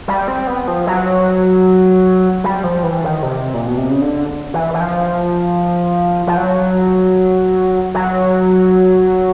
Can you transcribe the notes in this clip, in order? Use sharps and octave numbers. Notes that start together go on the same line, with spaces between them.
G3
C4
B3
F3
F#3
G3
F3
E3
D#3
C3
A#2
B2
C3
C#3
D3
E3
E3
F3
F3
F#3
F#3